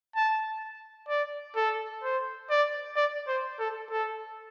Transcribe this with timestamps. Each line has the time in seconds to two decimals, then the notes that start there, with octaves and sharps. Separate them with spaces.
0.16 A5
1.09 D5
1.56 A4
2.03 C5
2.50 D5
2.96 D5
3.28 C5
3.60 A4
3.91 A4